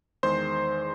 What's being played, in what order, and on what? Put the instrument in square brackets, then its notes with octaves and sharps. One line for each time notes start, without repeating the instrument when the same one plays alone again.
[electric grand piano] E2 D#3 G#3 C5 C6